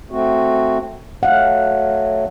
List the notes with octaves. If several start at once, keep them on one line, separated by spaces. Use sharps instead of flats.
A3 C4 F#4
F#3 A3 F5 F#5